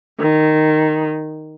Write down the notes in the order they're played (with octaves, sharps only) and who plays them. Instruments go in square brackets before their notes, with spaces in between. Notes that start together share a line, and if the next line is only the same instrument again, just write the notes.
[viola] D#3